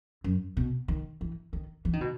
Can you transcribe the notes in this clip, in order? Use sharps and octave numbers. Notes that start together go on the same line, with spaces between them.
F#2
B2
D#3
E3
D#3
E3
D#3
B2